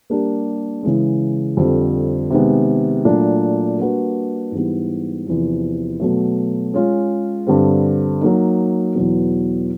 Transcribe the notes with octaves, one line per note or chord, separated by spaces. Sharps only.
G3 A#3 D4 G4 A#4
C#3 E3 G#3
F2 D3 G3 C4
C3 D#3 G#3 B3
A#2 F#3 A3 D4
G3 A#3 D4 F#4 B4
G#2 E3 G3 B3
E2 C3 F3
B2 F#3 A3
G#3 C#4 F4
G2 D3 G3 C4
F#3 A#3 D#4
E2 B2 F#3